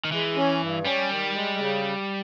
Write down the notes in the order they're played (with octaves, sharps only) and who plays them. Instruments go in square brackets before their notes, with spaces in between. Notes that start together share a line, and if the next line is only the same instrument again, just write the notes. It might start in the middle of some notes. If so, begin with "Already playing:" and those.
[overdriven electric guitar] D#3
[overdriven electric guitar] E3 [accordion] G#3
[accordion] C#4
G2
[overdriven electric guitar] G3 [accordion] C#4
[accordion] D#3
G#3
C#3